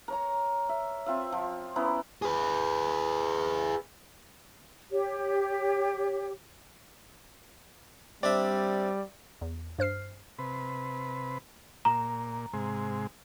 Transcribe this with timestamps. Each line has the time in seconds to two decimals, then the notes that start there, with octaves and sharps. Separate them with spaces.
0.08 A#4 C#5 A#5
0.69 E5
1.06 C4 F4 E5
1.32 F3
1.76 B3 C#4 E4 A#4
2.22 G#4 B4
4.90 G4 C#5
8.23 G3 C4 D4 D5 E5
9.41 E2
9.79 G2 C5 F6 C7
10.39 C3 B4
11.85 A#2 A#5
12.53 G#2 C3 G#3